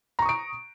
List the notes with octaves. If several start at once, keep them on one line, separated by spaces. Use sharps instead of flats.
A#5 C#6 D#6 D7